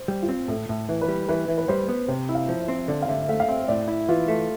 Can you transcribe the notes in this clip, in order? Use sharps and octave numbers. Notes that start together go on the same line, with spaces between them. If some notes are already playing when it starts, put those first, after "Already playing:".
Already playing: C5
G3
F4
C4
A2 A4
A2
E3
B4
G3
E3 B4
E3
B4
G3 C5
B3
C3 C5
E4
F5
F3
E5
C4
E5
D3 D5
F5
D3 E5
E5
A3 F5
F5
C4 E5
A2 D5
E4
E3 F4
A3